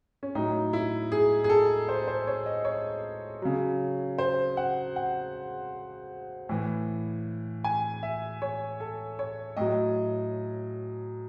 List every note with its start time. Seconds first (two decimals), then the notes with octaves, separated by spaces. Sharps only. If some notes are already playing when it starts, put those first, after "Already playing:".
0.23 C#4
0.35 A2 F#3 D#4
0.73 E4
1.12 G#4
1.44 G#4
1.49 A4
1.89 C5
2.08 C5
2.27 C#5
2.46 D#5
2.65 C#5
3.42 C#3 F#3
4.18 C5
4.57 F#5
4.96 F#5
6.49 A2 E3
7.64 G#5
8.03 E5
8.42 C#5
8.80 A4
9.19 C#5
9.57 A2 F#3 D#5